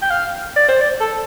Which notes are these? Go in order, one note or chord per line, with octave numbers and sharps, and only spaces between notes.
G5
F5
D5
C5
D5
A4